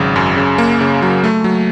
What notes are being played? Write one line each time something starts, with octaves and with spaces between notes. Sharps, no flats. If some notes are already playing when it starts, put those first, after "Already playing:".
Already playing: G#1 C#3 F#3
F#2
C#3
A#3
C#3
F#3
A3
F#3